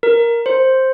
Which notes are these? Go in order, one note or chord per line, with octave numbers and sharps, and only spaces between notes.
A#4
C5